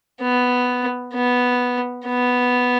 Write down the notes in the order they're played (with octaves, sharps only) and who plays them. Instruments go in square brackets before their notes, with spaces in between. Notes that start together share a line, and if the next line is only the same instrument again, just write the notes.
[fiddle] B3
B3
B3